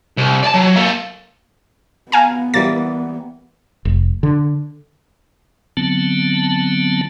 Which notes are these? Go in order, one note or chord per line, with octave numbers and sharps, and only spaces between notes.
C2
D5 A5
F#3
A#3 A4
B3 F5 G#5 A#5
E3 G3 A#3 A6
F1
D3
D3 F#3 B3 C4 A5